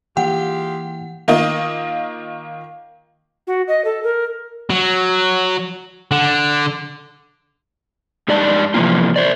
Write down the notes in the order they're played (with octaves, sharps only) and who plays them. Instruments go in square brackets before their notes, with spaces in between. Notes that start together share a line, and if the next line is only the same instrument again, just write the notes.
[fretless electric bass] E3 A#3 [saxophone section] G#3 F4 G4 [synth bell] F#5 [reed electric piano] G5
[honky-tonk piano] D#3 A#3 F4 D#5
[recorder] F#4
D#5
A4
A#4
[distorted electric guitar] F#3
D3
[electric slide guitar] G2 G3 G#3 D#4 D5 A5
C3 E3 F3 A#3 F4
C5 D5